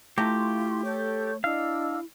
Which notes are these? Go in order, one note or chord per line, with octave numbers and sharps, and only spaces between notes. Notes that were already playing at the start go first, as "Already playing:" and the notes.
A3 E4 F4 G4 A#5 C6 C#6
A4 C#5 C#6 G6
D4 E4 D#5 F5 E6